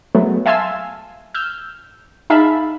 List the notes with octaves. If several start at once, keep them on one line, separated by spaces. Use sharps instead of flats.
F#3 G#3 A3 B3
E5 F5 G#5 A5 C6 E6
E6 F6 G6
D#4 G#4 E5 F5 A5 B5